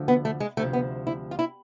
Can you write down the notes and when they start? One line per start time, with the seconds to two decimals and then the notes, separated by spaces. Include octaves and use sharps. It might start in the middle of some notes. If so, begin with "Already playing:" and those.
Already playing: D2 D3 F3
0.08 B3
0.25 A3
0.40 G#3
0.57 D2 C3 F3 A3
0.73 B3
1.07 E4
1.31 F4
1.39 E4